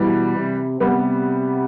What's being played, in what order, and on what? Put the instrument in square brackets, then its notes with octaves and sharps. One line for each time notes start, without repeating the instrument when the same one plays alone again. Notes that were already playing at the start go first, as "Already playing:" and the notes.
Already playing: [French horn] B2 [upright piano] E3 G3
[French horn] C3
[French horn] C3 [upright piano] G3 B3